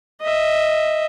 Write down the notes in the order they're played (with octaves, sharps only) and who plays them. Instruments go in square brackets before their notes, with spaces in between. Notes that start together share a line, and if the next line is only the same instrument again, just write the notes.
[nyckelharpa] D#5 E5